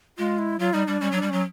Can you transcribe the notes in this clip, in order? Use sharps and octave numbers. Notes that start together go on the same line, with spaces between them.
G#3 F4
E4
F#3 F4
G3 D#4
G3 D4
G3 C#4
F#3 D4
G3
F#3 C#4